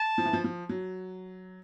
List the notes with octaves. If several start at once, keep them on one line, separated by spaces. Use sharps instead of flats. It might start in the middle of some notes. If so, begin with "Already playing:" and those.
Already playing: A5
F3
E3
F3
F3
F#3